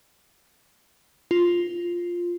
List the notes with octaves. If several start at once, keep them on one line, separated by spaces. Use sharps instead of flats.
F4